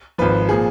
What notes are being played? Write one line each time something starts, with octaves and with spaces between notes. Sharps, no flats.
G#1 G#2 F3 B4
A#2 F3 G#4